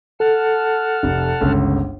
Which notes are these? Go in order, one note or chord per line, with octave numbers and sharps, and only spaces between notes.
A4 F#5 A5 F6
F1
G1 C#2